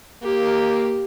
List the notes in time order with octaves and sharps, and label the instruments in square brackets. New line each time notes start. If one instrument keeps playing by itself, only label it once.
[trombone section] A#3 [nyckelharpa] G4